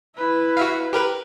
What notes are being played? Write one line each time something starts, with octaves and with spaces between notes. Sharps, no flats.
E4 B4
F#4 E5 F5
G4 A#4 B4